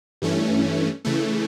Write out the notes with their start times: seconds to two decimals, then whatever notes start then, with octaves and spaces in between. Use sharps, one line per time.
0.22 G2 E3 A3 C#4
1.05 C#3 E3 A3